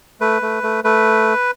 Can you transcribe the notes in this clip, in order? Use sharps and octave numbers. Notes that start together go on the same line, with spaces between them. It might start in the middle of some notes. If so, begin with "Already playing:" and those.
A3 B4
A3
A3
A3 B4